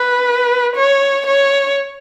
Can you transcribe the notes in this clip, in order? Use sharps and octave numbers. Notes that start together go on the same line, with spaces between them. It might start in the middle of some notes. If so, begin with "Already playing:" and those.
Already playing: B4
C#5
C#5